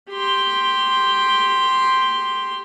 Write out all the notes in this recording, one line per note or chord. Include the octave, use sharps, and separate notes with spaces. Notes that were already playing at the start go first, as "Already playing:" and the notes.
G4 C6